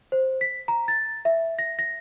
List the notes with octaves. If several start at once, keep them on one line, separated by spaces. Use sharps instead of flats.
C5
B6
A#5
A6
E5
A#6
A#6